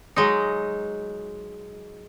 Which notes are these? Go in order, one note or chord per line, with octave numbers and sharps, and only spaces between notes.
F#3 G#3 D#4